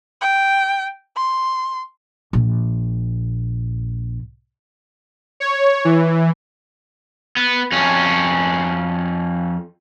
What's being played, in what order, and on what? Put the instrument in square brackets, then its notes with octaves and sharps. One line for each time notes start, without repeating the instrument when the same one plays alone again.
[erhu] G5
C6
[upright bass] A#1 A#2
[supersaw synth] C#5
E3
[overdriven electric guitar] B3
F2 C#4